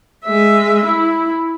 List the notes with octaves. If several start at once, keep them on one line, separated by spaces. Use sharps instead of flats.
G#3 E5
E4